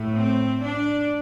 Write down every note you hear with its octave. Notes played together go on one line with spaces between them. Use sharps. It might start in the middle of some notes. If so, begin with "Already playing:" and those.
Already playing: A2 A3
C4
D4